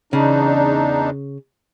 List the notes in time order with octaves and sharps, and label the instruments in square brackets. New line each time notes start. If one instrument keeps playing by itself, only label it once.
[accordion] E2 D4 D#4 [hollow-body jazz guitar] C#3